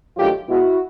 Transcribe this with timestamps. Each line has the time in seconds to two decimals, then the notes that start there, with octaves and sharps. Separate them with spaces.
0.17 G2 D#3 F#3 A3 F4 G4
0.49 B2 G#3 B3 E4 F#4